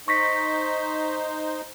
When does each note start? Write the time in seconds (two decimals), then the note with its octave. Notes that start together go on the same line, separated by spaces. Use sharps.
0.08 D#4 C5 C#6 A#6 B6